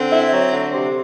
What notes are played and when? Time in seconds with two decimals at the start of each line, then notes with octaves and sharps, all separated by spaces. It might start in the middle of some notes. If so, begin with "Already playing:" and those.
Already playing: D3 C4
0.10 E4
0.31 F#3
0.53 D3
0.73 C3